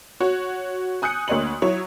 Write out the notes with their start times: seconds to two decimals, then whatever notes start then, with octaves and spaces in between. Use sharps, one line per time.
0.20 F#4 C#5
1.02 G#5 D#6 F#6 G6 C#7
1.28 D2 A#3 C#5 D#5 C6 F#7
1.62 F#3 E4 C#5